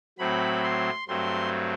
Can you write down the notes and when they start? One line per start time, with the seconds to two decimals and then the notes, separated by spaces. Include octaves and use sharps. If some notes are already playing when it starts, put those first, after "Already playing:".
0.19 A2 F#3 A3 C4 B5
0.64 C6
1.08 G2 F#3 A3 C4 C6